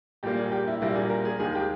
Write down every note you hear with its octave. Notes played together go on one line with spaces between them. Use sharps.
A#1 A#2 G3 A#3 G4
G#4
G4
E4
A#1 A#2 G3 A#3 E4
G#4
A#4
G#4
D#2 D#3 G#3 G#4
G4